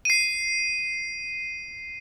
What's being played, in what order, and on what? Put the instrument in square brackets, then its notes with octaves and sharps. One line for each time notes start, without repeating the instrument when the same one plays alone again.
[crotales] C7 D#7